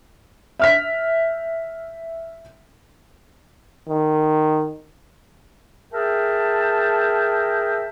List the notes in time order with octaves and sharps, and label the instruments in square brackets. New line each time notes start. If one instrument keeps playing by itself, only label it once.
[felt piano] E5 F6 B6
[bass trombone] D#3
[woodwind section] G#4 A#4 E5 G5 A5